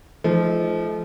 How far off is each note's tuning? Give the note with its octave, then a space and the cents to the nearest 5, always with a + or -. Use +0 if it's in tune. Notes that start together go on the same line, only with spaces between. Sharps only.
F3 -20 A3 -30 D#4 +0